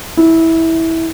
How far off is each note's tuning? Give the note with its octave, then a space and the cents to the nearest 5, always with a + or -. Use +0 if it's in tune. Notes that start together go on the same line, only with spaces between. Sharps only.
E4 -15